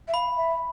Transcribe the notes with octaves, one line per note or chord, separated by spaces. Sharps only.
E5
F5 B5
E5